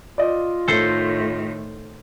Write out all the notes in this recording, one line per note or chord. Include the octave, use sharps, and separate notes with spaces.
F4 D5 D#5
A2 D#3 A4 C5